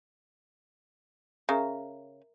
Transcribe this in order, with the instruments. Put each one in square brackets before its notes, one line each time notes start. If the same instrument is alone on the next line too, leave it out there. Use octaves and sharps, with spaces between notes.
[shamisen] C#3 [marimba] A#4 E5 A#5